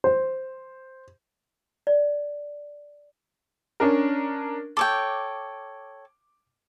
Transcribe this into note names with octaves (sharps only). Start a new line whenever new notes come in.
C5
D5
C#4 D4 A#4
A4 C#5 G5 D6